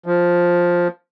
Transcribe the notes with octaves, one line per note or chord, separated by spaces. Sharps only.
F3